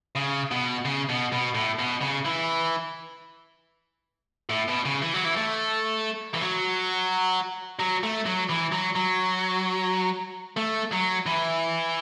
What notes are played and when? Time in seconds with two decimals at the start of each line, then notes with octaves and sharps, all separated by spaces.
0.16 C#3
0.52 B2
0.85 C#3
1.09 B2
1.32 B2
1.54 A2
1.79 B2
2.01 C#3
2.25 E3
4.49 A2
4.68 B2
4.85 C#3
5.02 E3
5.14 F#3
5.25 E3
5.37 A3
6.34 E3
6.41 F#3
7.80 F#3
8.03 A3
8.26 F#3
8.49 E3
8.72 F#3
8.96 F#3
10.57 A3
10.92 F#3
11.26 E3